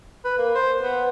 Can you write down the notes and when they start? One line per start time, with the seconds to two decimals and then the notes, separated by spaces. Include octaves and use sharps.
0.25 B4
0.38 A#3
0.55 C5
0.82 B3